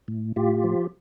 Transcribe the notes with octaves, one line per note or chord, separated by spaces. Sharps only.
A2
A2 F4 G4
F3